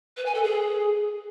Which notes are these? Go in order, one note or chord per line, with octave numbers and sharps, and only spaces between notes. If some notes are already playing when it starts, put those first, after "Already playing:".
B4
G#5
A4
G#4